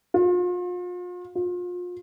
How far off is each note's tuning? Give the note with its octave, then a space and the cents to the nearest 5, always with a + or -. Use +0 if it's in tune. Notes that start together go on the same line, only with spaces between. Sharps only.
F4 +40
F4 +35